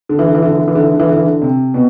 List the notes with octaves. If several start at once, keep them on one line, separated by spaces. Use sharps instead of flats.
D3
E3
D3
E3
D3
E3
D3
E3
D3
E3
D3
E3
D3
E3
D3
C3
B2